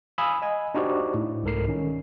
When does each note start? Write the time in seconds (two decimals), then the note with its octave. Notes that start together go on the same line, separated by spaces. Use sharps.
0.18 F5 G#5 B5 D#6 E6
0.42 D#5 G#5
0.75 D4 D#4 F#4 G4 C5 D5
1.14 A2
1.43 C2 G#2 A4 A#4 C7
1.68 D#3 C#4